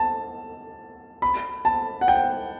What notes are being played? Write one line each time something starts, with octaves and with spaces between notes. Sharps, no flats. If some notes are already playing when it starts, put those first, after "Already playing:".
Already playing: A5
B5
A5
F#5
G5